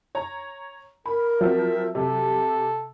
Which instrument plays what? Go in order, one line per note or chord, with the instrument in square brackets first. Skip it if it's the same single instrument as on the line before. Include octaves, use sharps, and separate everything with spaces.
[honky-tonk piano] C#5 A#5
[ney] A#4 [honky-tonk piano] B5
[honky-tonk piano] F3 C4 [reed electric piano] F#3 [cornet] E5
[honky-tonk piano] C3 [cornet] A4 [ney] E5